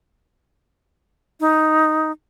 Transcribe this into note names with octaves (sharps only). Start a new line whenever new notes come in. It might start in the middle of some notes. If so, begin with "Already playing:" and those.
D#4